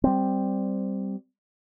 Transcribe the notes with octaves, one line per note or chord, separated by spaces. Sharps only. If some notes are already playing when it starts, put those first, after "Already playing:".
G3 C4